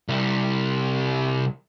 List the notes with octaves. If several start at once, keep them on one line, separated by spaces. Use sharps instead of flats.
C2 G3